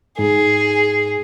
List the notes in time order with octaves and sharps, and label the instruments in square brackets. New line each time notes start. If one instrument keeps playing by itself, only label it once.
[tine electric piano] G#2 [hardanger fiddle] G#4